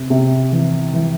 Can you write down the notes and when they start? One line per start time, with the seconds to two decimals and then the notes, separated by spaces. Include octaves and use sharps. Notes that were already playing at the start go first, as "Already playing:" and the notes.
Already playing: C3
0.10 C3
0.52 E3
0.93 E3